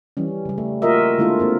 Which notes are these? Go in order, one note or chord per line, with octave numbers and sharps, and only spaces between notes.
E3 G3 C#4
C#3 G3
A3
A#3 F4 F#4 A#4 D#5 E5
D3 G#3 A#3 E4 F4 A4
A#3 C4 A#4